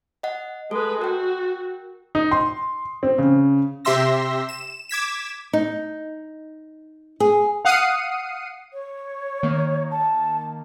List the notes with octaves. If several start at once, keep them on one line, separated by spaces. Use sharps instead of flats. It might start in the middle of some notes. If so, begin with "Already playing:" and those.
D#5 F#5
G#3 A4 B4
F#4 A#4 G5
D#4
C6
C4
C#3
C3 G4 E5 C6 E6 A#6
E7
D6 G#6 B6 E7
D#4
G#4
F5 F#5 D#6 C7 C#7 D#7
C#5
D#3 A#3
A5